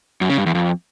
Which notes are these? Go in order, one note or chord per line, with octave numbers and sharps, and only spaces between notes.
F#2
C#3
G2
E2
F2